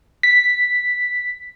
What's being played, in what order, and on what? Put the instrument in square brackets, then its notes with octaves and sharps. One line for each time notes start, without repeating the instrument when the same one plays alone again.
[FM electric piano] B6